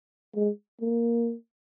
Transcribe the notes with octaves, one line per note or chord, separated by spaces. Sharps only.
G#3
A#3